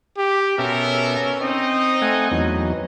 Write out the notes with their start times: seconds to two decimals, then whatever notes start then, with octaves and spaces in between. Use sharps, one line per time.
0.18 G4
0.58 B2 B3 C#4 A4 A#4 E5
1.41 C4 D#4 C5 D#5
2.02 A3 F#5 G#5
2.31 E2 F#3 D#4